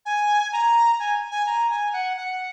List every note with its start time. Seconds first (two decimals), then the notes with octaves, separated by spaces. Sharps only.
0.05 G#5
0.52 A#5
0.99 G#5
1.31 G#5
1.46 A#5
1.70 G#5
1.93 F#5
2.17 F#5